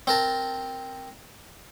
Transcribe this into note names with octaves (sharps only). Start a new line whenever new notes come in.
C4 A#4 A5